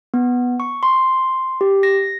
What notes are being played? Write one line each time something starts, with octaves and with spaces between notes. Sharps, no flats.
B3
C#6
C6
G4
A#6